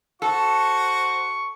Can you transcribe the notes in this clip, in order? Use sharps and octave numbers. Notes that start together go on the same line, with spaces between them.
F#4 A4 C5 C#6